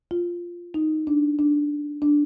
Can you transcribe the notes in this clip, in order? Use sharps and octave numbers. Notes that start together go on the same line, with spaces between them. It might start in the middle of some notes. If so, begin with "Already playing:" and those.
F4
D#4
D4
D4
D4